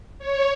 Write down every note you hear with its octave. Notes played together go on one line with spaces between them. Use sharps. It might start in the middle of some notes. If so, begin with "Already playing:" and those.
C#5